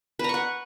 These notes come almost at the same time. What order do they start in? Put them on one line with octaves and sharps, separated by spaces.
B4 A#5 C#6 F#5